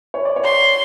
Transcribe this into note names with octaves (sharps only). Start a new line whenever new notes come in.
C#5
D5
C#5
C6